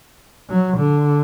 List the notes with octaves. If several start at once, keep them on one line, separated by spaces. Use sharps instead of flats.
F#3
D3